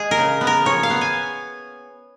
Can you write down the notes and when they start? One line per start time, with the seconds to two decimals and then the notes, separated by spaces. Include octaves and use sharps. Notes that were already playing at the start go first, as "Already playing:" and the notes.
Already playing: G#3 G#4
0.11 A#4
0.18 C#3
0.41 B3
0.47 A#4
0.65 F3 C#5
0.83 F5
0.90 B3
1.01 G#5